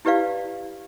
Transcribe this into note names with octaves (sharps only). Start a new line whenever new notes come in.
E4 G4 B4 D5 F5